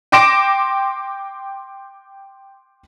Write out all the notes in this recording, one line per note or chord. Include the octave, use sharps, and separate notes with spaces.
G5 C6 D6 A#6 D7 E7